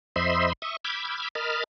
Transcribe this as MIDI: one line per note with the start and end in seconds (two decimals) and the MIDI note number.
0.16 0.53 41
0.16 0.53 72
0.16 0.53 75
0.16 0.53 76
0.16 0.53 83
0.16 0.53 84
0.62 0.77 76
0.62 0.77 85
0.62 0.77 87
0.85 1.28 83
0.85 1.28 86
0.85 1.28 88
0.85 1.28 89
0.85 1.28 91
0.85 1.28 92
1.35 1.64 70
1.35 1.64 75
1.35 1.64 81
1.35 1.64 83
1.35 1.64 89